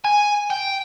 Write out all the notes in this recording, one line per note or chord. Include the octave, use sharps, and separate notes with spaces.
G#5
G5